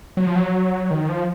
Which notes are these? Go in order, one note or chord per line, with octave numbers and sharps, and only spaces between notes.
F#3
F3
F#3
D#3
F3